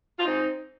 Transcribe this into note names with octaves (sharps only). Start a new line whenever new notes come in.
F4
G#2 C4 D#4